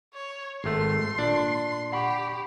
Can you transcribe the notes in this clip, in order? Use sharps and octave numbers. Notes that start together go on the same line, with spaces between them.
C#5
G#1 A3 C6
A#2 D4
G4 F#5 B5 C#6